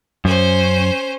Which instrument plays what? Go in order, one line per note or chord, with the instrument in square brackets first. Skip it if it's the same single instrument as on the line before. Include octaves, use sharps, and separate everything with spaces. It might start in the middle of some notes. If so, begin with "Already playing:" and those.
[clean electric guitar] F#2 [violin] C#4 C5